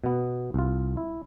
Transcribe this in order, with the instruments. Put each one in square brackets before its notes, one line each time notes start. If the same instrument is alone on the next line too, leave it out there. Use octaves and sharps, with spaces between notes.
[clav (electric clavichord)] B2 B3
C2 F4
E4